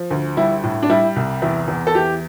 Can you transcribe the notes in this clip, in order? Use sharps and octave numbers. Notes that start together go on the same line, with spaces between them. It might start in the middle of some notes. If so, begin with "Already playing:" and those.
Already playing: F3
D2
G3 E4
A2
D4
G3 E4
C2
E2 E4
E2
A4
E3 G4